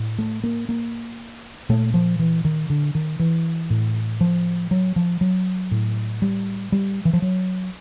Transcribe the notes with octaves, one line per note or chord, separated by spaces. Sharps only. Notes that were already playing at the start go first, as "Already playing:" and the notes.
Already playing: A2
A3
A#3
A#3
A#2 A3
F3
E3
D#3
D3
D#3
E3
A2
F3
F#3
F3
F#3
A2
G3
G3
E3
F3
F#3